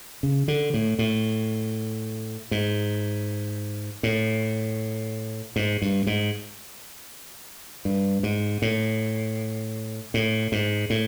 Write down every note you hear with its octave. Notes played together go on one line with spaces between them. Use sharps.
C#3
D3
A2
A2
G#2
A2
G#2
G2
G#2
G2
G#2
A2
A2
G#2
A2